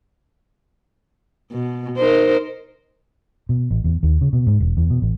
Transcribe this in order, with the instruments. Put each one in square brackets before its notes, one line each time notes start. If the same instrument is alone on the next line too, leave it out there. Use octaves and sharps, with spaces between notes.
[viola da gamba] B2
D#4 A#4 C5
[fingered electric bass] B2
A1
E2
D#2
C#3
B2
G#2
E1
E2
B2
A1